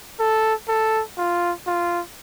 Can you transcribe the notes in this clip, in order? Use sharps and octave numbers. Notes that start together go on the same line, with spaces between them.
A4
A4
F4
F4